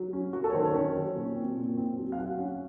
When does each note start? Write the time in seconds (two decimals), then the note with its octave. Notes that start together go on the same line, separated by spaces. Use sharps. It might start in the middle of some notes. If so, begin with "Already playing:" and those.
Already playing: F#3
0.13 C#4
0.33 F#3 F#4
0.44 A4
0.50 C#5
0.54 D#3 C5
0.64 C#5
0.74 C#4 C#5
0.95 F#3
1.15 A#2
1.36 C4
1.57 A#2
1.77 C4
1.97 F#3
2.12 F5
2.18 F#3 F#5
2.38 C#4